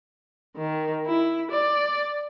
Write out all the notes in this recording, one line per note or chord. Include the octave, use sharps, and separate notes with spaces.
D#3
E4
D5